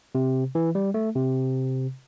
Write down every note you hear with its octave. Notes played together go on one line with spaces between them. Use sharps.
C3
E3
G3
A3
C3